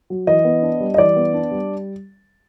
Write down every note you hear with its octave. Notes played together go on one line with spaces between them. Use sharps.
F#3
E3 D#5
B3
D4
G3
D#5
E3 D5
B3
D4
G3